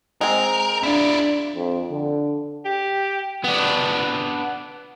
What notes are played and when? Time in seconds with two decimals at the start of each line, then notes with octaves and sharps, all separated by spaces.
0.21 G#3 C4 A#4
0.83 D4 E4 F4
1.56 F2
1.90 D3
2.65 G4
3.44 B3 D4